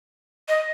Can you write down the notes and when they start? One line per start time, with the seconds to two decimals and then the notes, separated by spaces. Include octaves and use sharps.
0.48 D#5